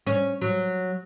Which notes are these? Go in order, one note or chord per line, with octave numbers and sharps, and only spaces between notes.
C#4
F#3